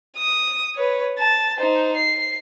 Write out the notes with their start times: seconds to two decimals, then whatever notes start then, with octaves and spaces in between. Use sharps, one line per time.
0.17 D#6
0.75 B4 C#5
1.18 A5
1.56 D#4 C5
1.96 C7